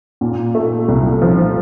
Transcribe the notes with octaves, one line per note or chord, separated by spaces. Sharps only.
A#2
A3
C2
F3